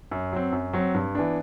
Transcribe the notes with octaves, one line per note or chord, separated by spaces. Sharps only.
F#2
F#3 C4
F#2
F#3 C4
G2
E3 B3 D4